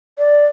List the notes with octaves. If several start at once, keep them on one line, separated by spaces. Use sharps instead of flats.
D5